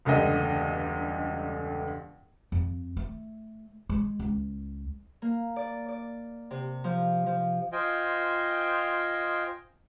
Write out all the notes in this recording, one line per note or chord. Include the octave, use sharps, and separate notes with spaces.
E1 C#2 G2 D3 A3 D#5
F2
A3
G#3
C#2
A#3
D5
D5
C3
F3
F3
F4 C5 D#5 G5 G#5